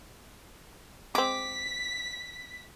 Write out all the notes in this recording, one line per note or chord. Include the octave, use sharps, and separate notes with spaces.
G#3 C4 D6 B6